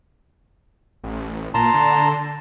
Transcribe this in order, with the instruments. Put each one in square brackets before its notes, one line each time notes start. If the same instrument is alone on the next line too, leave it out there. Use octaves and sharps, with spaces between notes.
[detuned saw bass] A1
[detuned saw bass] A#2 [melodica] A5 A#5 C6
[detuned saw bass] D3